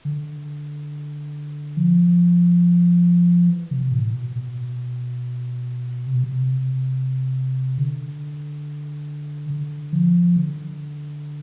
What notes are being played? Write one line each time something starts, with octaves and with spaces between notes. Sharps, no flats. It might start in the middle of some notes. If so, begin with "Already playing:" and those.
D3
F3
E3
C3
A2
B2
B2
C3
B2
C3
D3
D3
F3
D3